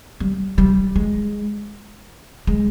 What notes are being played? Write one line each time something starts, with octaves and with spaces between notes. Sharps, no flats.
G3
G3
G#3
G#3